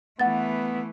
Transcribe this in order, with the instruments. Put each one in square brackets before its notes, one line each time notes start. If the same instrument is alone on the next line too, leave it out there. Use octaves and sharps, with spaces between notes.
[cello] E3 A3 [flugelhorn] B3 [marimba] F#5 A6